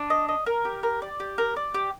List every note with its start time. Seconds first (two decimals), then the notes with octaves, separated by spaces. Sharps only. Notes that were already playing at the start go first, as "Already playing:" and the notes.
Already playing: D4
0.10 D#5
0.29 D#5
0.46 A#4
0.65 G4
0.83 A#4
1.02 D5
1.20 G4
1.38 A#4
1.56 D5
1.74 G4